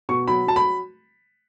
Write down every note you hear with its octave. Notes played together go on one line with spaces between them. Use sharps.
B2 C#6
F#3 B5
F#3 A5
B5